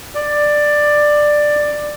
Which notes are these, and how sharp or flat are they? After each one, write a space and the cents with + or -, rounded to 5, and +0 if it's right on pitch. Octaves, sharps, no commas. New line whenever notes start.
D5 +10